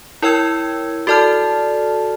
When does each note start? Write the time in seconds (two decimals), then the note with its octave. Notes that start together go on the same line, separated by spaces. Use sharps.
0.22 E4 A#4 C#5 G5 E6 G#6
1.07 F#4 A4 D5 A5 F6